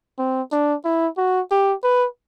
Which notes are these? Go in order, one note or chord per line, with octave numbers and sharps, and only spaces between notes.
C4
D4
E4
F#4
G4
B4